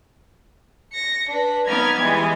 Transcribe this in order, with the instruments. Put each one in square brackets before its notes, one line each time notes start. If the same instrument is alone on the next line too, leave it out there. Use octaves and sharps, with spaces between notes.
[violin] A#6 C#7
D4 B4
[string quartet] B3 D#4 D5 [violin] F6 G#6
[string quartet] E3 G3 G#3 [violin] G#5